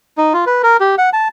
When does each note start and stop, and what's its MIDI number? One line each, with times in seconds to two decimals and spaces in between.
0.18 0.33 63
0.34 0.45 65
0.46 0.62 71
0.63 0.77 70
0.80 0.95 67
0.98 1.10 78
1.13 1.28 81